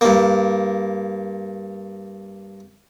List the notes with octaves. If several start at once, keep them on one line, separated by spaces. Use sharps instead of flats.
G2 A#3